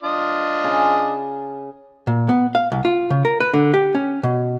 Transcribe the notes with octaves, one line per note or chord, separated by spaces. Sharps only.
D4 F4 D#5
C#3
A#2
B3
F5
C2
F4
C#3
A#4
B4
D3
G4
C#4
B2